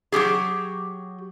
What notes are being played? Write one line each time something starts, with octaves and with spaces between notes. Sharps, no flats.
F#3 C4 G4 G#4